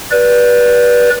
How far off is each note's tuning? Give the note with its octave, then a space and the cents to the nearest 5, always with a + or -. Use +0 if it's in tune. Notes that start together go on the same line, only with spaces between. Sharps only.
B4 -25 D5 +0